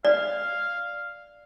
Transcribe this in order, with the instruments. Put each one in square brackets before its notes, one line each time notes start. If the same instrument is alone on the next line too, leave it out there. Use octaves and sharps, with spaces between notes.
[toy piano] D5 [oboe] F5